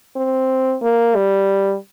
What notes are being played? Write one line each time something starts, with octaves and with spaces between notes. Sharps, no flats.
C4
A#3
G3